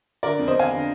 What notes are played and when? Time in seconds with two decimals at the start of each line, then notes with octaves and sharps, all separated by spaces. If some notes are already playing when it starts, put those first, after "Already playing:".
0.23 D3 A#4 D5
0.39 F2
0.48 C5 D#5
0.55 F2 F5 G#5
0.71 D3